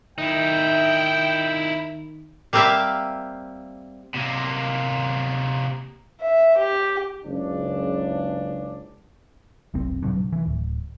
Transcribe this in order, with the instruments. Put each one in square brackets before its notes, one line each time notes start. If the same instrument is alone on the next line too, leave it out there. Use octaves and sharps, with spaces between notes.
[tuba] D#3 [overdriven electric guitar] D#4 E4 [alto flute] E5 [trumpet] G5
[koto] G3 A#3 C4 G4 E5 F5
[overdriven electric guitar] C3 A#3
[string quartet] E5
G4
[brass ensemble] F#1 C#2 C#3 D4
[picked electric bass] F1 B1 C4
G2 B2 F#3
D#3 E3
D1